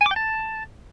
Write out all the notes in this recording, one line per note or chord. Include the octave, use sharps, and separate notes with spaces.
G#5
D6
G5
A5